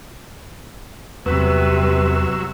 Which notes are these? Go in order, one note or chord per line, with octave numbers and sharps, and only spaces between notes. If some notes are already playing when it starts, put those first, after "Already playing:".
E2 G2 C3 F#3 B4 E6